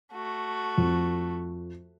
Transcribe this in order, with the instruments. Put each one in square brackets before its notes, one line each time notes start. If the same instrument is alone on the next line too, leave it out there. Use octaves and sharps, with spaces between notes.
[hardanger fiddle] A3 F#4
[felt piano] F2